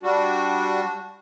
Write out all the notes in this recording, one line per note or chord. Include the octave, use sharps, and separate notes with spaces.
G3 D4 F#4